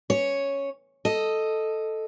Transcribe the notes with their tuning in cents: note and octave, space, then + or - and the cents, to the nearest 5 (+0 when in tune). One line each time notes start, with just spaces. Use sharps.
C#4 +0 C#5 +0
A4 +0 D#5 +0